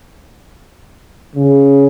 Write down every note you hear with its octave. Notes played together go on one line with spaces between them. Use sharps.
C#3